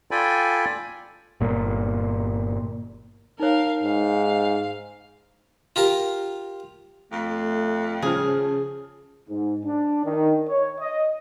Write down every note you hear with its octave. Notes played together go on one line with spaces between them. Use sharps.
F4 A4 D5 G5 G#5 B5
G1 A#2
D#4 A#4 C#5 F5
G#2 F5
F4 G4 A#4
F2 A3
C#3 F3 G#4 F6
G#2
D4
D#3
C#5
D#5